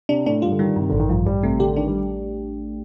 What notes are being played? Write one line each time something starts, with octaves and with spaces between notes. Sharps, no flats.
C3 D4
A2 D4
G2 F4
D3
D#3 G3
G2 C3
A1 D3
D#3
G2 F3
A1 G3
C3 A3
D3 G4
D#3 D4
G3